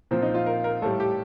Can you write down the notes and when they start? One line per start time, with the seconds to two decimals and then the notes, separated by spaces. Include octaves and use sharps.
0.11 A#2 F3 C4
0.22 D#4
0.34 F4
0.46 A#4
0.64 A#4
0.82 A2 G3 A4
1.00 G4